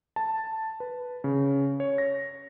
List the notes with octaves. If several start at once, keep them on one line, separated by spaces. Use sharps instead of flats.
A5
B4
C#3
C#5
A#6